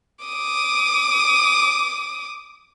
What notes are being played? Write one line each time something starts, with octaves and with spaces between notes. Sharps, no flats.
D6 D#6